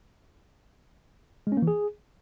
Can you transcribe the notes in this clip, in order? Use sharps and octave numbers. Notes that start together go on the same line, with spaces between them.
G#3
C#4
A#3
E3
G#4